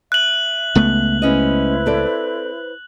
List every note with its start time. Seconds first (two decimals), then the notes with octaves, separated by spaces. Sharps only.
0.12 E5 F#6 F#7
0.75 C#2 A3 B3
1.22 G#3 C#4 E4 B4 C5 D#5
1.86 C4 A4 D5